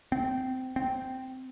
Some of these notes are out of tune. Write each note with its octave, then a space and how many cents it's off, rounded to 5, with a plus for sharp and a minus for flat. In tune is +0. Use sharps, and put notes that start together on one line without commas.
C4 -20
C4 -10